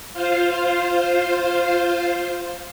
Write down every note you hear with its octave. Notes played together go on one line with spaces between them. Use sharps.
F4 C5 F5